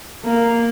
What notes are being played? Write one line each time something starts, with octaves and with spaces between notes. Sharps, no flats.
A#3